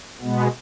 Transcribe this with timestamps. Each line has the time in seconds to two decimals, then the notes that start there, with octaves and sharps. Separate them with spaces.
0.21 B2 G#3 B3